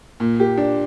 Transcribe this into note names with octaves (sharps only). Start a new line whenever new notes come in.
A#2
G4
D4